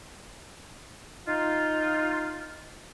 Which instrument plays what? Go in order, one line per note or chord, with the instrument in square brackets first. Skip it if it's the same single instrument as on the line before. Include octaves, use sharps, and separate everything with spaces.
[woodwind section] D#4 F4